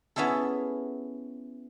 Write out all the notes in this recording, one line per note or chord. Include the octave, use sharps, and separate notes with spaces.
B3 C#4 E4 G#4 A4